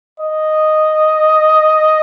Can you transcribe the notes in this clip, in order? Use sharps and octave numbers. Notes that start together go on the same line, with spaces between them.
D#5